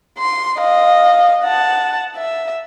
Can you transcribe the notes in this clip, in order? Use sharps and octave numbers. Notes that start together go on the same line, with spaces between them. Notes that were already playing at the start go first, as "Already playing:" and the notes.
C6
D#5 F5
F#5 A5
E5